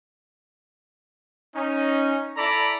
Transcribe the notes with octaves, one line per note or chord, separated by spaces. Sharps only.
C#4 D#4
E4 A4 D5 A#5 B5 D6